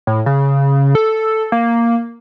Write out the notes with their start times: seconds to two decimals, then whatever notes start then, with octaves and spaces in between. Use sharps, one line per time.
0.07 A2
0.26 C#3
0.95 A4
1.52 A#3